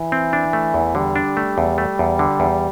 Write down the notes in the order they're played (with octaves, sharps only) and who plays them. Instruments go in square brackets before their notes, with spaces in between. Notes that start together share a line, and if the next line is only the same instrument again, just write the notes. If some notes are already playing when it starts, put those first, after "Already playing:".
Already playing: [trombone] E3
[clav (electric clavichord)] C4
D4
A3
E2
[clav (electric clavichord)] D3 [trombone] G3
[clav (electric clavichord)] D4
A3
E2
A3
E2
D3
E2